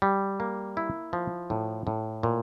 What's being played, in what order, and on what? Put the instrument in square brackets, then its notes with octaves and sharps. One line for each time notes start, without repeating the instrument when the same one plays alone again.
[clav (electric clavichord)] G3
A#3
E4
F3
A2
A2
A#2